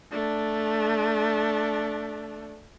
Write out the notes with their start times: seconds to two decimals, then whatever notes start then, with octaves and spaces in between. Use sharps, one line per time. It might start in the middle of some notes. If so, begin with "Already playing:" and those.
0.12 A3 D4